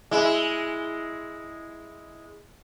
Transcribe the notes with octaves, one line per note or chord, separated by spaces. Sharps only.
G#3 E4